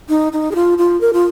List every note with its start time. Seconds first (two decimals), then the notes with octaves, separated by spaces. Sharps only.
0.09 D#4
0.33 D#4
0.51 G#4
0.55 F4
0.78 F4
1.01 A#4
1.13 F4